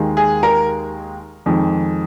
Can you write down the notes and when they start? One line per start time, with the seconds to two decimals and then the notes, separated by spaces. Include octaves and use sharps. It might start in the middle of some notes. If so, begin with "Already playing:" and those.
Already playing: D#2 D#3 G#3
0.17 G#4
0.43 A#4
1.46 F2 D#3 G#3